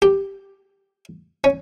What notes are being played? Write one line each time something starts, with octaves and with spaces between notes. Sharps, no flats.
G4
C#4